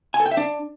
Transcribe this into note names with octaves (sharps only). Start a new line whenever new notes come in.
G#5
A4
G5
E5
D4